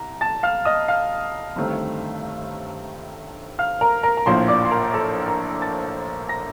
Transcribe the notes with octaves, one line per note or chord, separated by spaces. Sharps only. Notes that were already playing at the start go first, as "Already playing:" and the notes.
Already playing: C2 A#5
A5 A6
F5 F6
D#5 D#6
F5 F6
G1 G2 D#3 A3 C4
F5 F6
A#4 A#5
A#4 A#5
A#5
A#1 A2 F3 A#3 C5 C6
D5 D6
C6
A#4 A#5
A4 A5
A#4 A#5
A5 A6
A#5 A#6